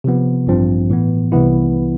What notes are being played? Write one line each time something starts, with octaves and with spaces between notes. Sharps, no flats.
C3 F3 B3
A1 G2 F3 C4
A2 E3 B3
C2 C3 E3 B3 E4